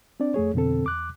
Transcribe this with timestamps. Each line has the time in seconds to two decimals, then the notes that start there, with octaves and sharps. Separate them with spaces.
0.20 C4 D4 D5
0.34 F2 A3 G#4 C#5
0.54 F2 B2 D3 C4 A4
0.84 E2 D6 F#6